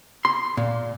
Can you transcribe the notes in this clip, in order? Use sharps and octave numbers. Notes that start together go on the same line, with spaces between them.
C6
A#2